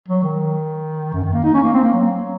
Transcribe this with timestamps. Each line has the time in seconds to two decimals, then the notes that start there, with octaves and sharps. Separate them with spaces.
0.08 F#3
0.23 D#3
1.13 F#2
1.23 D#3
1.33 A#3
1.43 D#4
1.53 C#4
1.63 A#3
1.74 C4
1.83 A#3
1.93 F#3